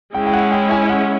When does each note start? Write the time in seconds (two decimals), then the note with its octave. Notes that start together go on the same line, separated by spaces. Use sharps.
0.14 G#3 C#4 E4 G5
0.26 G5
0.33 F#5
0.52 G5
0.71 G#5
0.89 F#5